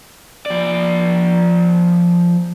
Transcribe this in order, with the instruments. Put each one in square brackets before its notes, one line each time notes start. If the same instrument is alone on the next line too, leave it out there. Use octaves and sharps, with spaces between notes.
[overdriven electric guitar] F3 D5